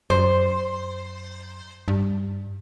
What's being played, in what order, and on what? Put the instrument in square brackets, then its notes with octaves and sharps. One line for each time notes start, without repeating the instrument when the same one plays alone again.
[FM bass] F#2 [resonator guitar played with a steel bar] C5
[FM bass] G2